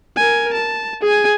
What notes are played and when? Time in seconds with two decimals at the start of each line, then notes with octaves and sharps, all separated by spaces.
0.16 A#4 G#5
0.54 A5
1.01 G#4 G#5